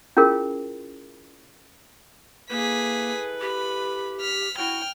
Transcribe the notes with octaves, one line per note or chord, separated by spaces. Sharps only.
C#4 E4 F4 G#4 A#4
A#3 E4 G#4 A4 B4 B6
G4 B5
F6 B6
E4 F#4 G5 F6